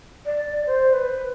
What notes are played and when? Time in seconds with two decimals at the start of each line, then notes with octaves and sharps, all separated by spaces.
0.26 D5
0.66 C5
0.93 B4